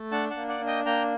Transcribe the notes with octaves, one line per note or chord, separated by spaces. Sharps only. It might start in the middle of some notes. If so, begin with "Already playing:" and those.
Already playing: A3
D4 F#5 A5
F#5 A5
A#3
D5 F#5
D4
D#5 G5
A#3 G5 A#5